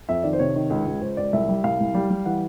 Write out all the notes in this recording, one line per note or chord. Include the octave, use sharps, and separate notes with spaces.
F2 E5
D#3 D5
C5
C3 C#5
D#3
C#2
C#2
C#2 C5
C#2 D5
C2 E5
G3
C2 F5
C2
G3
G3
E3 F#5